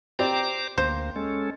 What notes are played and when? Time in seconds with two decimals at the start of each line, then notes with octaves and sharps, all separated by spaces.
0.19 C4 G4 C5 D5 A#5 D6
0.78 D2 A#3 C5
1.16 G#3 C#4 A4